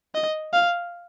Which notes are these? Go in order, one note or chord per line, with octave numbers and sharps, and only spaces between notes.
D#5
F5